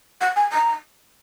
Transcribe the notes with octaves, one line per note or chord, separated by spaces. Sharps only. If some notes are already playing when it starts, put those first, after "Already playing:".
F#5
G#5
A#5